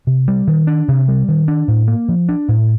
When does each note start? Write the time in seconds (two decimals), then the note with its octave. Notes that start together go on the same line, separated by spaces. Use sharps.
0.07 C3
0.28 G3
0.47 D#3
0.67 D4
0.88 C3
1.08 G3
1.28 D#3
1.48 D4
1.68 A2
1.88 A#3
2.08 F3
2.29 D4
2.48 A2